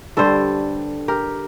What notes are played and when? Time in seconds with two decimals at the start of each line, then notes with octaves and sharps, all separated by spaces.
0.17 G2 D3 G3 A4 C5
1.08 G4 A#4